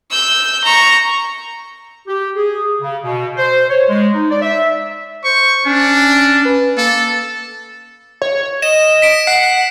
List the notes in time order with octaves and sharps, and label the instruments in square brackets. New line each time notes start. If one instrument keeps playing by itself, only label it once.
[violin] E6 G6
A#5 C#6
[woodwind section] G4
G#4
C#3
B2
C5
C#5
G#3
D#4
D5
E5
[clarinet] C5 [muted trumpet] C#6
[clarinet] C#4 [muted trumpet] D4
[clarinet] B4
[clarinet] A#3 [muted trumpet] A4
[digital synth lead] C#5
[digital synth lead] D#5 [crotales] E7
[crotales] B6 D7
[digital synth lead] F#5 [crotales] C7